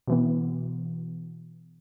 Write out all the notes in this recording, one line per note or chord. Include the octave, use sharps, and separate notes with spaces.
B2 E3 B3